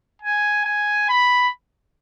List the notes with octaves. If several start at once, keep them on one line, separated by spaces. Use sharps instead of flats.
G#5
G#5
B5